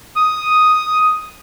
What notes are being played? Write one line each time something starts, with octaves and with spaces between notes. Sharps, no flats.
D#6